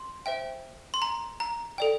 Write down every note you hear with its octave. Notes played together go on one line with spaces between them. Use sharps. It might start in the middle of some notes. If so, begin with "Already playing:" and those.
Already playing: C6
C5 E5 G5
C6
A#5
A#5
A4 D5 G5